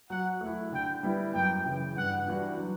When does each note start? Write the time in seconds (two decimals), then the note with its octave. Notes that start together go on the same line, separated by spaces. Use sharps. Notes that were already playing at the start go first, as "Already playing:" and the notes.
0.10 F#3 F#5
0.41 A3 E4
0.72 D3 G5
1.03 G3 B3 E4
1.34 F#2 G5
1.65 C#3 E3
1.97 G2 F#5
2.28 E3 G3 D4 F#4
2.59 F#3